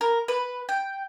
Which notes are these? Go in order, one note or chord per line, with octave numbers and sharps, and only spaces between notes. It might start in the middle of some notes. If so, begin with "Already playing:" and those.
A#4
B4
G5